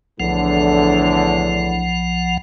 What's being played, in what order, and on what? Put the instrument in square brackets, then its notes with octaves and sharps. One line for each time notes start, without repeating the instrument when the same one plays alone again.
[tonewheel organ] B1 F3 F#5 [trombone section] E2 A2 D3